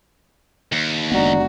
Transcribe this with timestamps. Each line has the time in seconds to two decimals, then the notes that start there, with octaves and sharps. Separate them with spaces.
0.72 D#2
1.12 F#1 G#3 B3 D4 F#4 D5 A#5